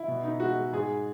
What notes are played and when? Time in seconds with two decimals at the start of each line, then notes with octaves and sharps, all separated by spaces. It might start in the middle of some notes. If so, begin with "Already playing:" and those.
Already playing: E4
0.08 B2
0.24 D#4
0.40 G#3 F#4
0.56 G#3
0.72 G#2 G#4